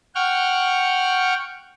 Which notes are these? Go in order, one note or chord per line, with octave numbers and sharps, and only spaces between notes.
F#5 G5 C#6 F6